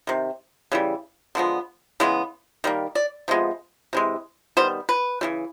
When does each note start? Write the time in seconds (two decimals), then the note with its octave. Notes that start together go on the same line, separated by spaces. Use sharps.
0.07 C3 D#3
0.72 C#3 E3 G3
1.35 D3 F3 G#3 B3
2.00 C#3 E3 G#3 B3
2.64 D#3 G3 A#3
2.95 D5
3.28 C3 F3 G#3 B3
3.93 C3 E3 G#3
4.57 D#3 G3 B3 C5
4.89 B4
5.21 C#3 E3 G3